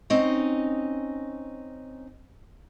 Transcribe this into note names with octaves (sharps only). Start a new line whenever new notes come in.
C4 C#4 D#4 D#5